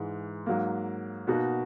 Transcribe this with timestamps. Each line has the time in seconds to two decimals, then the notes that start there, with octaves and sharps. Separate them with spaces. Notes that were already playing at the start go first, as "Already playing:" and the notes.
Already playing: G#2 E3 G#3
0.46 G#2 F#3 A#3
1.27 B2 A#3 D#4 F#4